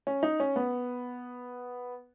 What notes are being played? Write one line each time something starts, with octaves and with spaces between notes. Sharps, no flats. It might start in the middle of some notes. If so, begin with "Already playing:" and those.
C#4
D#4
C#4
B3